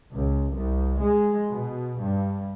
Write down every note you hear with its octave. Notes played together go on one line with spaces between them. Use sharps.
C#2
C2
G#3
B2
G2